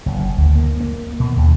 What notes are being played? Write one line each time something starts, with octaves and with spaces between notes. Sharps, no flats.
F#1
D2
A#3
A#3
B2
D#2